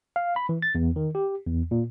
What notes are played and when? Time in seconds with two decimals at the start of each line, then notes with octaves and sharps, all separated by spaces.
0.16 F5
0.36 B5
0.49 E3
0.62 A6
0.75 E2
0.96 D#3
1.15 G4
1.46 E2
1.71 A#2